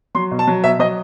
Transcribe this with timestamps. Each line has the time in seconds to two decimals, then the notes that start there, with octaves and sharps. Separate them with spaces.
0.15 F#3 C6
0.31 B2
0.39 A5
0.47 F#3
0.64 B2 E5
0.79 F#3 D#5